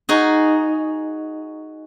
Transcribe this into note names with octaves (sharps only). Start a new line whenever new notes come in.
D#4 F#4 G#4